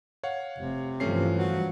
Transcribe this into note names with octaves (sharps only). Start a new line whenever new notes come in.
C#5 F5 F#5
F1 C3
G2 E3 F3 A3 C#4 C7
F#3